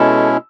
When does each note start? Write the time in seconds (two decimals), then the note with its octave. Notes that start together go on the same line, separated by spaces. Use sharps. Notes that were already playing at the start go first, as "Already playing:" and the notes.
Already playing: B2 G#3 C#4 E4 A4